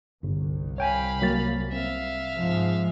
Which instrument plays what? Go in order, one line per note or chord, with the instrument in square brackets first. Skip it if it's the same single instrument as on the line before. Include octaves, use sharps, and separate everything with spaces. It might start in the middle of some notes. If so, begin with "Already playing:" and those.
[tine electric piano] G1 [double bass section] C2
[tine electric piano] C#5 G5 G#5 [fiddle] F5 B5
[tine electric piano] F#3 A#3 A6
[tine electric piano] C4 [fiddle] E5 F5
[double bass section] G#2 F3 G#3